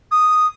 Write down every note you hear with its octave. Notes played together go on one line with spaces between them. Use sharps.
D#6